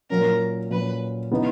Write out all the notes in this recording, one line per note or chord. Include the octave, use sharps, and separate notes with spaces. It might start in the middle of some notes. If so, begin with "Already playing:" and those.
A#2 F#3 C#4 A#4
A#2 F#3 C#4 B4
C#3 E3 B3 D#4